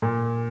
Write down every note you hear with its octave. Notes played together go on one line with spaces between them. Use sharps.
A#2